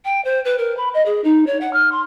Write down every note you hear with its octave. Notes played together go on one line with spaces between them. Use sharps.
G5
C5
B4
A#4
B5
D#5
G#4
D#4
C#5
F#5
F6
C6